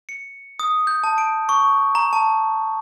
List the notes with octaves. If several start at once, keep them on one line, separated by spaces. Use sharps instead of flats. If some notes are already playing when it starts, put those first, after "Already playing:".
C#7
D#6
G6
A5
D7
C#6
A#5
A5